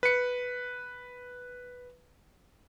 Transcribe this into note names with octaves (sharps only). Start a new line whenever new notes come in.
B4 C#7